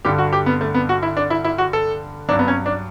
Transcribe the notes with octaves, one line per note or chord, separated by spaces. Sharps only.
G2 D3 G3 G4
F#4
G4
B3
A3
B3
F#4
E4
D4
E4
E4
F#4
A4
G2 F#3 D4
B3
C#4
D4